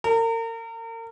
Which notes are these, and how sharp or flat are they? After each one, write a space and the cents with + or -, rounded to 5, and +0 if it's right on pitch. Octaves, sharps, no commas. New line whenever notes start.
A#4 -35